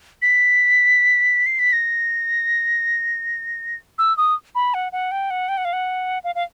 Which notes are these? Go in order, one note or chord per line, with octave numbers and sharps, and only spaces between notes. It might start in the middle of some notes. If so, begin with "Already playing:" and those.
B6
C7
B6
A#6
E6
D#6
B5
F#5
F#5
G5
F#5
G5
F#5
F5
F#5
F5
F5